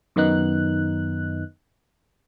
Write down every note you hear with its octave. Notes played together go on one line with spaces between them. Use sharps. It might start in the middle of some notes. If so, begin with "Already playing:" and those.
F#2 D#3 B3 D#4 F#6